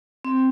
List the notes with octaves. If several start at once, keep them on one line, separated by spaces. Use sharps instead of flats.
C4